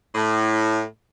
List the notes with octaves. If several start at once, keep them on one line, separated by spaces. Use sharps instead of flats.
A2